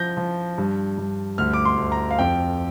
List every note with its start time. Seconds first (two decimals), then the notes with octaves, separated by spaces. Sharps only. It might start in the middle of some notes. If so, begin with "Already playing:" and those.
Already playing: F3 G6 A#6
0.17 F3
0.58 G2
0.98 G2
1.38 D2 F6
1.53 D6
1.65 C6
1.78 D2
1.92 A#5
2.11 F5
2.19 F2 G5